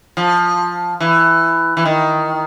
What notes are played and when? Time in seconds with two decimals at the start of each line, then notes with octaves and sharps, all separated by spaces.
0.17 F3
1.00 E3
1.77 E3
1.85 D#3